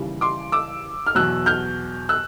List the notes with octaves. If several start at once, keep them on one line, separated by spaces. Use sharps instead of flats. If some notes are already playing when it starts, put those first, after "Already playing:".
Already playing: D#2 C#3 E3 G3
C6 D6
D6 E6
F6
E2 B2 F#3 E6 F#6
F6 G6
E6 F#6